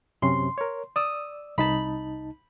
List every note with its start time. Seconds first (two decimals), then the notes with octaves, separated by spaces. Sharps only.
0.22 F#2 C3 C#4 C6
0.58 A#4 C#5
0.96 D5 D#6 E6
1.58 C2 D#4 A5 B5